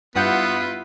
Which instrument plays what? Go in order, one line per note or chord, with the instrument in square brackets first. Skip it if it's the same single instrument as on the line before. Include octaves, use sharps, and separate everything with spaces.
[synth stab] G2 F#5 G6 [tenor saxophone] B3 [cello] E4 F4 [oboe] B4